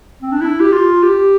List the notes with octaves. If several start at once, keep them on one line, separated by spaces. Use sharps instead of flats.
C4
D4
E4
G4
F4
G4